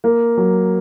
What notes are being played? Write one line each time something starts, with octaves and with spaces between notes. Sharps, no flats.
A#3
F#3